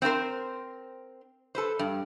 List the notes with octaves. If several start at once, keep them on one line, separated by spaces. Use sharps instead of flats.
C4 E4 F4 A#4 C5
A4 B4 C5
G2